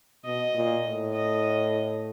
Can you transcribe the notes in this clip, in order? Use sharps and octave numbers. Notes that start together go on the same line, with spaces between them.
B2 D#5
A#2
A2
D#5